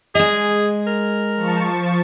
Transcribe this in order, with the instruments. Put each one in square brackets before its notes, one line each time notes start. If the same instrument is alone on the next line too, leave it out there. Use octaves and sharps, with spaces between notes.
[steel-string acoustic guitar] G#3 D#5 [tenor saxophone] G#4
[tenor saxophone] A#4
[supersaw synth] F3 A5 C#6